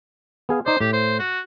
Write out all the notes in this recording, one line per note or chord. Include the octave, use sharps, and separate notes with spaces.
B3 G#4 F5
D#4 C5 D5
A2 G4
C5
F#4